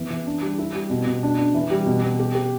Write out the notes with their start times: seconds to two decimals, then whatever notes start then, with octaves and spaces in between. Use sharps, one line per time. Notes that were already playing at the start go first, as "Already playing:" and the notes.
Already playing: E3 B3
0.10 E3
0.27 D4
0.42 G3
0.59 E4
0.75 G3
0.90 B2
1.07 B2
1.23 D4
1.38 D4
1.54 E3
1.70 G3
1.86 B2
2.02 B2
2.19 G4
2.35 G4